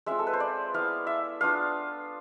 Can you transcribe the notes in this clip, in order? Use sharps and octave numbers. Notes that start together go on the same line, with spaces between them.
G#3 C4 F4 E5
A4
B4
C5
D5
B3 E4 F5
E5
B3 D4 F4 F5